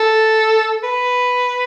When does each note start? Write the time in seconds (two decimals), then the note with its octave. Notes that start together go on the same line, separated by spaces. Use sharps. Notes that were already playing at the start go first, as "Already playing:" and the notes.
Already playing: A4
0.83 B4